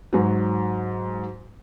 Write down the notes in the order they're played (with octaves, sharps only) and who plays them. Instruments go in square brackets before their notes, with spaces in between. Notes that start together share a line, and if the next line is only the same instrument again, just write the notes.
[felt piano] G#2 F#3